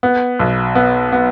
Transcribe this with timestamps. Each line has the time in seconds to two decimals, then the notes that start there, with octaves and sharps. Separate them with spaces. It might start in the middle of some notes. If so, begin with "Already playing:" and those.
0.03 B3
0.39 B1
0.75 B3
1.12 B3